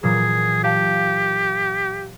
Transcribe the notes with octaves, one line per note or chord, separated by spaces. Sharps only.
A#2 E3 F#3 G#4
G4 D5 F5 A5